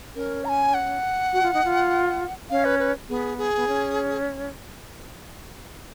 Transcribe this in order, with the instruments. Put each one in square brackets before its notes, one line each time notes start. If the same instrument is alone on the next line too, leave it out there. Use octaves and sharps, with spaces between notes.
[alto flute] C#4 [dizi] A#4
[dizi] A#5
G#5
F#5
[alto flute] F#4
F4
D#4
F4
[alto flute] C#4 [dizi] F5
[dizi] B4
B4
[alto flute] B3 [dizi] G#4
[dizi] G#4
[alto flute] B3
C#4